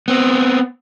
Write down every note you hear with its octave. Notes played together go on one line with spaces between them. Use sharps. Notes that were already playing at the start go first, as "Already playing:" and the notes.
B3 C4